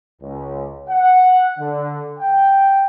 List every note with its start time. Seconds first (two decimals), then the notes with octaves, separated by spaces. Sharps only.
0.22 C#2
0.89 F#5
1.58 D3
2.19 G5